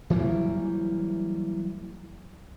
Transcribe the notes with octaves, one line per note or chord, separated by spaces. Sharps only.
E3 F#3 G3 A#3